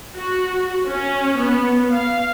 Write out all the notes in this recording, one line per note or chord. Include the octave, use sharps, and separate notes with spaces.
F#4
C#4
B3
F5